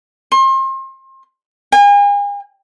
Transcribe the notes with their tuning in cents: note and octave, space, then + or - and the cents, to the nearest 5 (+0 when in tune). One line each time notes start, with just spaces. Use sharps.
C6 +35
G#5 -40